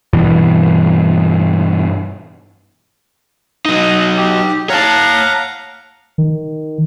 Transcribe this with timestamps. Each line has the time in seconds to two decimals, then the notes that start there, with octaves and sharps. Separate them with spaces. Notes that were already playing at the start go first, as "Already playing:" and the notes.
0.13 G2 B2 E3
3.65 F#3 D#4 D#5
4.17 G4
4.70 C#5 F5 F#5 A5 A#5
6.18 D#3